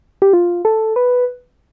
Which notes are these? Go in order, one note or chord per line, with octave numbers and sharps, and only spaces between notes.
G4
F4
A4
B4